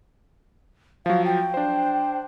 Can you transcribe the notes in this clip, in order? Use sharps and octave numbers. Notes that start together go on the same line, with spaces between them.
F3 F#3 F5
G5
D4 C5